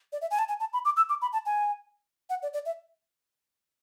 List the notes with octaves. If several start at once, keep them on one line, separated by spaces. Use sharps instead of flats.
D5
E5
G#5
A5
G#5
A5
B5
D6
E6
D6
B5
A5
G#5
F#5
D5
D5
E5